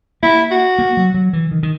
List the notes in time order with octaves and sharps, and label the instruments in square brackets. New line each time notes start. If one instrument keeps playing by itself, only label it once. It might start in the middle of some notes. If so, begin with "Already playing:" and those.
[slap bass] A#3 [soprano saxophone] E4
[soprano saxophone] F#4
[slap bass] A#3
F#3
F#3
E3
D#3
D#3